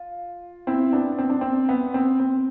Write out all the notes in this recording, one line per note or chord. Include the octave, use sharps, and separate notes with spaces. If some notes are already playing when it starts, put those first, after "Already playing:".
Already playing: F4
C4 E4
B3 D4
C4
D4
C4
B3
C4
C4